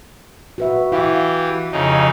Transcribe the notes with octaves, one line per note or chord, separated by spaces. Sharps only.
F#4 B4 E5
E3 E4 G4 F5
F2 C#3 D#4